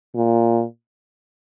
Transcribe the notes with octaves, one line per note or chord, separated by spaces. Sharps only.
A#2